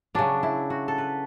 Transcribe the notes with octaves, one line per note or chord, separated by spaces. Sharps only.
C#3 F#3 D4
E4
F#4
A4
B4